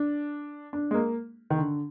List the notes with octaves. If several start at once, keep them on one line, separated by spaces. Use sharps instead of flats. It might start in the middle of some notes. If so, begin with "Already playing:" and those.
Already playing: D4
D4
G#3
A#3
D#3
D3